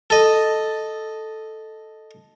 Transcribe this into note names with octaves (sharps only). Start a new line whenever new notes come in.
A4 D#5